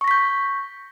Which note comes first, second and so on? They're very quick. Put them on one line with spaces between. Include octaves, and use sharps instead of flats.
C#6 A#6 B6 G6